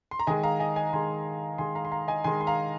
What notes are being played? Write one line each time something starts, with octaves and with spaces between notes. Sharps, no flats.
C6
A#5
D#3 G#3 D#5 G#5
F5 A#5
D#5 G#5
D#5 G#5
D#3 G#3 G#5 C6
D#3 G#3 G#5 C6
F5 A#5
C6
F5 A#5
D#5 G#5
D#3 G#3 G#5 C6
C6
F5 A#5